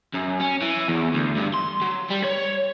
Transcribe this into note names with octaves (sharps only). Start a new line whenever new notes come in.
F#2
C#4
E3
E2
D2
G2
C6
F#3
G3
C#5